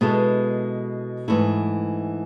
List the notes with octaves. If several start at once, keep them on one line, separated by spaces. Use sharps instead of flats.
B2 G#3 B3 E4 A4
G#2 E3 A3 E4